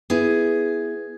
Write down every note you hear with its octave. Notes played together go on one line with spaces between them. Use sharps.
B3 E4 G#4